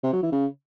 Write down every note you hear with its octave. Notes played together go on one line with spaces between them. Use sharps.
C3
F#3
E3
C#3